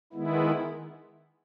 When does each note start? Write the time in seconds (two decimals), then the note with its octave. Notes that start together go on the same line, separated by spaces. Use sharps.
0.13 D#3 G#3 B3 E4